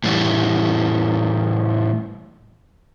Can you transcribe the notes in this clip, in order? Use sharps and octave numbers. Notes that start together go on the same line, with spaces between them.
A2 E3 G3